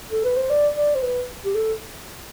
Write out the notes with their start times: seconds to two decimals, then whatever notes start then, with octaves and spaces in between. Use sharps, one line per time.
0.11 A4
0.24 B4
0.36 C5
0.50 D5
0.76 D5
0.95 C5
1.03 B4
1.45 G4
1.55 A4